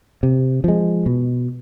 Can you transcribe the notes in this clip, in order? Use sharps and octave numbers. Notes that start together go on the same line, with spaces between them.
C3
F3 G#3
B2